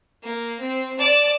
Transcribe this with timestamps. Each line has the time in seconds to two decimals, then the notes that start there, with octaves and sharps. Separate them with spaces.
0.23 A#3
0.60 C4
0.99 D5 A5